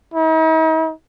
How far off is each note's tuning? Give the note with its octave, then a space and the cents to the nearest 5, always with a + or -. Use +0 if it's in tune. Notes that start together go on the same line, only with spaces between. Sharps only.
D#4 +45